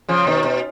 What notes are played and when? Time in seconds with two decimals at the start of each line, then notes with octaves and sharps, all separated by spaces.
0.09 C#3 F3
0.27 B2 D#3
0.44 B2